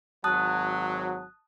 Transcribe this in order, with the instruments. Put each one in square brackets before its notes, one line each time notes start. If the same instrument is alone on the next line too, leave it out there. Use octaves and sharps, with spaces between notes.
[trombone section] G#1 F#3 [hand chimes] A5 D#6 F#6